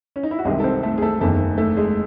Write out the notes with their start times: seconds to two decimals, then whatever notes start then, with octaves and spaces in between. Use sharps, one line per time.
0.16 C#4
0.23 D#4
0.31 E4
0.39 F#4
0.45 C2 C3 D#3 G#3 G#4
0.60 A4
0.64 C4 C5
0.83 A3 A4
0.98 G#4
1.02 A3 A4
1.20 F#1 E2 D#3 A3 A4
1.58 A3 A4
1.76 G#3 G#4